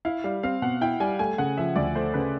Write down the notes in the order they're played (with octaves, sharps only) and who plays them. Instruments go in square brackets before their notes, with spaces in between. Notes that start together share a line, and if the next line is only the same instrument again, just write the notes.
[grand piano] E4 [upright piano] F5
[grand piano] G3 [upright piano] F5
[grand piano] C4 [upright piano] F5
[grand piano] B2 [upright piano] F#5
[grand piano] E4 [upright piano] G5
[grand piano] G3 [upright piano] G#5
[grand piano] A3 [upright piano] G#5
[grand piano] C#3 [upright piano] F#5
[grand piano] F3 [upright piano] E5
[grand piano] D2 [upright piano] D5
[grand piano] A3 [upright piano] C5
[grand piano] C#3 [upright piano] B4